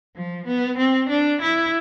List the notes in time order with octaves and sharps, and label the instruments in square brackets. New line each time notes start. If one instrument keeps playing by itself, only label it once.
[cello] F3
B3
C4
D4
E4